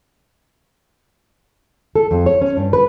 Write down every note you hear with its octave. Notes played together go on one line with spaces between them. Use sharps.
A4
F2
C#5
C#4
G2
B4